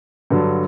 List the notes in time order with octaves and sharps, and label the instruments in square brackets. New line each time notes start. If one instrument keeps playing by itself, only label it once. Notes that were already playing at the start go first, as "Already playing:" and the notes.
[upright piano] G2 D3 F#3